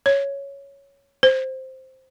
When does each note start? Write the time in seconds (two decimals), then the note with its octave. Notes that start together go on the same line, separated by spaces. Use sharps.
0.06 C#5
1.23 C5